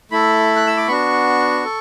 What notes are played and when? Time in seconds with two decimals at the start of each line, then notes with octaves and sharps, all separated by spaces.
0.11 A3 E4 A4 B5
0.56 F#6
0.67 E6
0.77 D6
0.88 B3 D4 F#4 C#6
1.65 A4